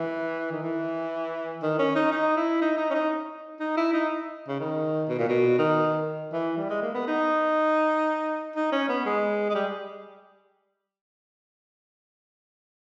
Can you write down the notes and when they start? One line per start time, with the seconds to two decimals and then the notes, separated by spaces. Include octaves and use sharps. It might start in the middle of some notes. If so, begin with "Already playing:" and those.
Already playing: E3
0.51 D#3
0.63 E3
1.62 D#3
1.79 C#4
1.95 D#4
2.12 D#4
2.37 E4
2.61 D#4
2.77 D#4
2.90 C#4
2.94 D#4
3.60 D#4
3.77 E4
3.93 D#4
4.48 C#3
4.59 D#3
5.09 B2
5.18 A#2
5.28 B2
5.58 D#3
6.33 E3
6.57 G3
6.70 G#3
6.82 A#3
6.94 B3
7.07 D#4
8.56 D#4
8.72 C#4
8.89 B3
9.05 G#3
9.50 G#3
9.54 G3